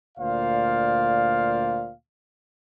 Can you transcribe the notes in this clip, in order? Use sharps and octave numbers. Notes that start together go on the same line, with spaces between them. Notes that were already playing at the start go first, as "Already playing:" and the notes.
D2 A#2 C5 D5 F5